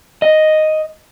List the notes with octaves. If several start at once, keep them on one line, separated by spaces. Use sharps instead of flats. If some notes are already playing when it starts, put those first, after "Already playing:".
D#5